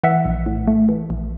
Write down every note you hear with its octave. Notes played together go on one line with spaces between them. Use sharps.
E3 E5 F#5
A#1
A2
A3
E3
A#1